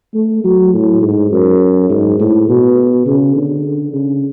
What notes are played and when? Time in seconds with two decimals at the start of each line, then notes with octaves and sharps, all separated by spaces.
0.15 A3
0.44 F#3
0.73 A2
1.02 G#2
1.31 F#2
1.89 G#2
2.20 A2
2.49 B2
3.07 C#3
3.36 D3
3.93 C#3